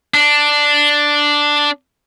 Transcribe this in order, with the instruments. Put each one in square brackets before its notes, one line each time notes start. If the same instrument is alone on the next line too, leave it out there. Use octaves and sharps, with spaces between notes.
[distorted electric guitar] D4